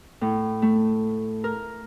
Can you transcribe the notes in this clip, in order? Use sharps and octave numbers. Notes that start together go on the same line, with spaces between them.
A2
A3
A#4